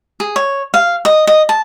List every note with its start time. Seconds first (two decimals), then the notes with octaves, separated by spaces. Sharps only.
0.20 G#4
0.36 C#5
0.74 F5
1.05 D#5
1.27 D#5
1.49 A5